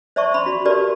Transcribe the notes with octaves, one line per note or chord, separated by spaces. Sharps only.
C5 D5 E5 A5 C#6
B5 C6
F#4
G4 A#4 B4 D5 A5